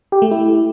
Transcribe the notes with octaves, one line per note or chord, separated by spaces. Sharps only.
G4
A3
E4